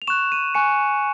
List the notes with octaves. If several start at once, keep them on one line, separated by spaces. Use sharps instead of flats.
F7
C#6 F#6 E7
D#7
G#5 C#6 F#6 C#7